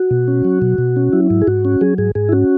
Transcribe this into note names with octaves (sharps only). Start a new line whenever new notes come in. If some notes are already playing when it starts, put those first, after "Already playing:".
Already playing: F#4
B2
C#4
F#3
B2
B2
C#4
F#3 E4
G#2
G#4
G#2 F#4
C#4
F#3 G#4
G#2 G#4
G#2 G#4
E4
C#4 F#4